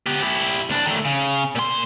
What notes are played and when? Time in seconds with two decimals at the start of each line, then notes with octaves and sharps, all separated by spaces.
0.06 B3 G4
0.23 E4 G4
0.70 C2 D4
0.86 D#3 A3
1.05 C#3
1.55 A#2 C6